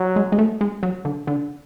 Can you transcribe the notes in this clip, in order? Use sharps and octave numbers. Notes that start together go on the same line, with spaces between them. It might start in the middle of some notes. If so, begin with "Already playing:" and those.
Already playing: F#3
G#3
G#3
A3
G#3
F#3
D3
D3